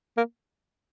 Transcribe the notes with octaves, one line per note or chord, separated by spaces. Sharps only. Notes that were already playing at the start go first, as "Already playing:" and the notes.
A#3